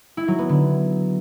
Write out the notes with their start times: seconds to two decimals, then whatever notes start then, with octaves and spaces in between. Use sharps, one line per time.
0.17 E4
0.28 F#3
0.39 B3
0.49 D3